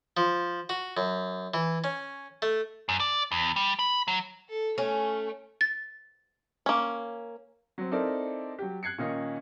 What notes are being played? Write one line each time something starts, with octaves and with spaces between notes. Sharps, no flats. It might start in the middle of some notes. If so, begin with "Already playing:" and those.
F3
F#4
F#2
E3
C#4
A3
F#2
D5
E2
G3
B5
F#3
A4
A3 C#4
A6
A#3 C#4
F#3 C4
C4 D#4 E4 A4 A#4 D5
F#3 G4
F#6 G#6 C7 C#7
A#2 D#3 C#4 D#4